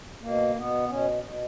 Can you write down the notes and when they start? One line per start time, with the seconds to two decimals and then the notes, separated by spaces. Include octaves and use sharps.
0.22 B2 A#3
0.55 B2 B3
0.89 B2 C#4
1.23 B2